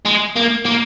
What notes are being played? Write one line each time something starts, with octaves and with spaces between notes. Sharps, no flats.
G#3
A#3
A#3